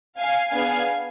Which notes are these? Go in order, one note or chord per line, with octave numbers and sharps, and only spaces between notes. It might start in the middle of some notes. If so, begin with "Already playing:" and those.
F5 G#5
B3 D4 G#4 F5 G#5